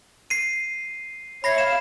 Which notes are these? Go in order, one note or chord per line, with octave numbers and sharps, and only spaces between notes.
C7 D#7
C#5 E5 B5 A#6 C7
F5 E7